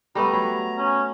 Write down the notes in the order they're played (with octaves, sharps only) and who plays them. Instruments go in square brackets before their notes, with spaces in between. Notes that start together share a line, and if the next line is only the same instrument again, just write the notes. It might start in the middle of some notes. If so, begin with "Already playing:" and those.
[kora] G3 A3 B3 [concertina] A#5
[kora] F#3
[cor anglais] C#4